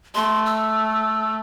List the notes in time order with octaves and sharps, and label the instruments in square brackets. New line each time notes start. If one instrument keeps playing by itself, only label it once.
[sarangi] A3 [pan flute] C6
[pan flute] E6